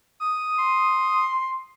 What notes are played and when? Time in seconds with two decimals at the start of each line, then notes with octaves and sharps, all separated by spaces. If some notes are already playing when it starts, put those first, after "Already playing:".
0.20 D#6
0.59 C6